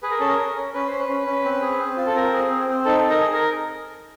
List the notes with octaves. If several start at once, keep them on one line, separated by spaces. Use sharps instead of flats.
G#4 B4
A#4
C#4 A4
A#4
C#4
C#4
C#4 B4
C#4 C5
B4
C#4
C#4
C4
G#4
C4
F4
A4
C4 A#4
G#4
C4
C4
D#4 A4
D#4 A4
A#4
G#4
A#4